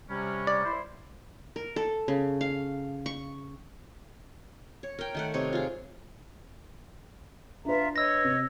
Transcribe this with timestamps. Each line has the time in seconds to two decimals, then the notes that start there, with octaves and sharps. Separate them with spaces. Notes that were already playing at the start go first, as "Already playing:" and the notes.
0.09 C3 G3 C#4
0.47 D5
0.65 E4 C5
1.56 A#4
1.76 A4
2.08 C#3
2.41 F5
3.06 C#6
4.83 C#5
4.98 A#4 G5
5.15 D#3 A3 F#5
5.34 C3 D#4 C#5
5.53 F4 G#4
7.65 D4 F4 B4 E5 A#5
7.96 C#5 D#5 E6 A#6
8.24 C3